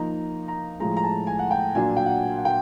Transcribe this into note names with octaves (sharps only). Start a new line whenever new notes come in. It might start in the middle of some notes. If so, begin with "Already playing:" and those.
Already playing: F3 A#3 D#4 A#5
A#5
A2 F3 G#3 A#5
A#5
A5
G#5
F#5
G5
A#2 F#3 A#3 D4 F4 G#5
G5
F#5
F#5
G5